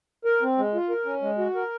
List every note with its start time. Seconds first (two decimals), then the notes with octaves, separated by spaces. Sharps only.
0.25 A#4
0.42 C4
0.58 G#3
0.74 F4
0.90 A#4
1.06 C#4
1.22 G#3
1.38 F#4
1.55 A#4